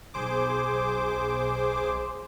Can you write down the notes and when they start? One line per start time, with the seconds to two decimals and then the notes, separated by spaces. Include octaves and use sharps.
0.14 B1 G#4 C5 D6